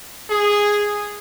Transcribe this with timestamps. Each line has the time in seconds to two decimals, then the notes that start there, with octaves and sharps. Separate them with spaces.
0.30 G#4